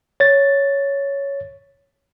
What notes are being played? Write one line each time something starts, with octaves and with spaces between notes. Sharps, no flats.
C#5 A6